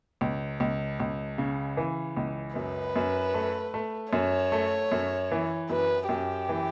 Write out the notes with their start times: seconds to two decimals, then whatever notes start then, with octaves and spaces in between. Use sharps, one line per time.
0.21 C#2
0.60 C#2
1.00 C#2
1.38 C#3
1.77 E3
2.17 C#2
2.56 F#2 B4
2.96 F#2
3.34 A3
3.74 A3
4.13 F#2 C#5
4.52 A3
4.92 F#2
5.32 E3
5.70 F#2 B4
6.09 F#2 G4
6.49 E3